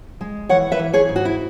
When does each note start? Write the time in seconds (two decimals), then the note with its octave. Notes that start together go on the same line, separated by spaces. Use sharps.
0.21 G#3
0.49 E3 C#5 F#5
0.72 B4 E5
0.79 E3
0.93 G#4 C#5
1.09 G#2
1.16 F#4
1.25 E4